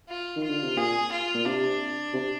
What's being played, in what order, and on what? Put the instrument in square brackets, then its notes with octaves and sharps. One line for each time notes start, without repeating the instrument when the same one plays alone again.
[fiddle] F4
[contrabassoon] D#3
[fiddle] F4
[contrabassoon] D3
C3
[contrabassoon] A#2 [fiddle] G#4
[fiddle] F4
[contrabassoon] A#2
[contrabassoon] C3 [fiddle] D4
[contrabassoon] C3